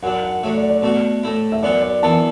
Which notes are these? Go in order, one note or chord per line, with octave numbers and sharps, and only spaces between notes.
F#2 F#3 D4 F#5
F#5
D3 F#3 A3 E5
D5
D5
B2 A3 F#4
A2 A3 E4
E5
F#2 F#3 B3 F#4 D5
D5
F#2 E3 B3 E4 A5